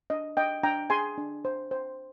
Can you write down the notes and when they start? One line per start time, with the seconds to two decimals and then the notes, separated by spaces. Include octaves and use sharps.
0.10 D4 D#5
0.37 D4 D#5 G5
0.63 D4 G5 A#5
0.90 G#4 G#5 C6
1.18 D4
1.45 C5
1.71 C5